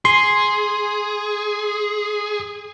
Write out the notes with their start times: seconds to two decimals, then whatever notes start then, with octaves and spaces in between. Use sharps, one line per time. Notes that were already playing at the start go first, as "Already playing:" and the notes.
0.05 G#4 C6